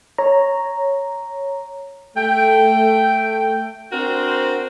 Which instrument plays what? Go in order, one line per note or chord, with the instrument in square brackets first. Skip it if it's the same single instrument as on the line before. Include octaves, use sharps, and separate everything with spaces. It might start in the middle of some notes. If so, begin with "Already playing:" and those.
[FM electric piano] C#5 A#5
[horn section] A3 G5
C4 D4 F#4 A#4 C5